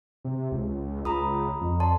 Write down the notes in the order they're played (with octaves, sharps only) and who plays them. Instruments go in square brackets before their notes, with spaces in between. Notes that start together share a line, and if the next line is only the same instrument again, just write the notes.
[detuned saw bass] C3
C#2
[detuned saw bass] C#2 [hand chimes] A#5 B5 D#6
[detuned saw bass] F2
[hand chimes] D5 A5 C6